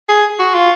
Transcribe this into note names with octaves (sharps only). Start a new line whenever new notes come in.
G#4
F#4
F4